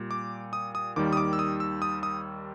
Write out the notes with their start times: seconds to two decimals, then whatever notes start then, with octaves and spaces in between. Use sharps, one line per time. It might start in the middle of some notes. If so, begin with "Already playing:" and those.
Already playing: A#2 G3
0.11 D6
0.53 D#6
0.75 D#6
0.96 D#2 D#3 G3 D6
1.13 D#6
1.17 D6
1.33 E6
1.39 D#6
1.60 E6
1.82 D#6
2.03 D#6